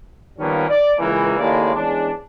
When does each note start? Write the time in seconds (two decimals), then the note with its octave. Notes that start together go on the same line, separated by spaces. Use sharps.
0.39 D#3 F3 G3 A#3 B3 C#4
0.69 D5
0.99 C#2 E3 A#3
1.38 D#2 A2 C#3 G#3 A#3 D5
1.75 E2 G#3 C#4 D4